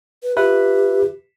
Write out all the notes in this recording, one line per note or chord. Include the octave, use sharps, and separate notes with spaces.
B4
F4 G4 B4 E5